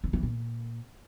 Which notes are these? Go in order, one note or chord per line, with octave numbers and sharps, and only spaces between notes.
D3
E3
A#2